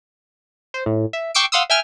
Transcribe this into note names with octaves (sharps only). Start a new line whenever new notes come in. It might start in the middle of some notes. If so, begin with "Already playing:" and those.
C5
A2
E5
G5 C#6 D6 E6 C7 D7
F5 F#5 C6 D#6 E6
E5 G5 G#5 F6